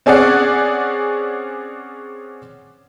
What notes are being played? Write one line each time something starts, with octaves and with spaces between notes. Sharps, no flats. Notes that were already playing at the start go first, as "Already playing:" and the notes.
C4 C#4 G#4 D5 F#5